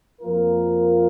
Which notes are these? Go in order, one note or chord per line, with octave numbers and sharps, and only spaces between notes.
F2 F3 A#3 F4 A#4